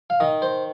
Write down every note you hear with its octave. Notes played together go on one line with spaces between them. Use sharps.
F5
D#3 D#5
C5